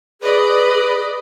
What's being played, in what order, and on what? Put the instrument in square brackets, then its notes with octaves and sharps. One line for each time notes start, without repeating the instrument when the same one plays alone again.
[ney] G#4 [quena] B4 [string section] D5 D#5